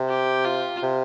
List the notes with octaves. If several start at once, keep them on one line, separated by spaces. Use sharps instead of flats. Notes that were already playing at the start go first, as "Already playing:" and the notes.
Already playing: C3
G4
F4
C3